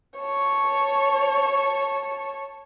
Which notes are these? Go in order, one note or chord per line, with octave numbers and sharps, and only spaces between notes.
C#5 A5